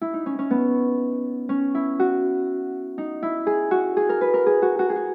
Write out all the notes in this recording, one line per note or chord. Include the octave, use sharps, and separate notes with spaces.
E4
D#4
C#4
C#4
B3
C#4
E4
F#4
D#4
E4
G#4
F#4
G#4
A#4
B4
A#4
G#4
F#4
F#4
G#4
F#4